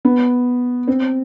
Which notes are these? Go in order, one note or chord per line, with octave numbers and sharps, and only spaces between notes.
B3
C4